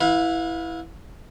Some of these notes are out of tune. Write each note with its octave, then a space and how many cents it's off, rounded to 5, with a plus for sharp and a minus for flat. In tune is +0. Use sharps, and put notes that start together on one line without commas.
E4 +0 B4 +0 F5 +35